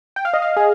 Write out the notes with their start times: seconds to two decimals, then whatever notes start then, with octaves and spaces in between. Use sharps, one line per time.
0.16 G5
0.25 F5
0.34 D#5
0.42 F5
0.57 G#4